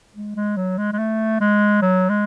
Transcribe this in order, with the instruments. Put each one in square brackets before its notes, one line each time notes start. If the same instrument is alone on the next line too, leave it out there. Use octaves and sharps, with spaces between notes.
[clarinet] G#3
G#3
F#3
G#3
G#3
A3
G#3
F#3
G#3